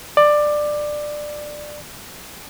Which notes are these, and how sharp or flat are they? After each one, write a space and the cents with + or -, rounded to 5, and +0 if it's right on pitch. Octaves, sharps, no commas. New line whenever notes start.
D5 +15